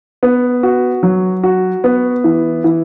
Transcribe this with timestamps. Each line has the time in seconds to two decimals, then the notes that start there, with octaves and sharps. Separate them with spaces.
0.23 B3
0.63 F#4
1.03 F#3
1.43 F#4
1.84 B3
2.24 E3
2.64 E3